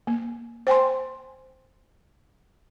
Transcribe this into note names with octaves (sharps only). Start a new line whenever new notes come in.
A#3
C5 G5 G#5 C6